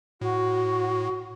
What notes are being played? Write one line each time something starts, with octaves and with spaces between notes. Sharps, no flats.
A2 F#4